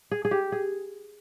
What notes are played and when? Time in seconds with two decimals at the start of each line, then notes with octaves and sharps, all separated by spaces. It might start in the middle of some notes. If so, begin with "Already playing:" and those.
0.11 G#4
0.25 G#4
0.31 G4
0.52 G#4